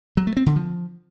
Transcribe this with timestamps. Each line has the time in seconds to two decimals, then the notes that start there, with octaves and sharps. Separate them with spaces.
0.17 F#3
0.27 A3
0.37 C4
0.46 D3
0.56 F3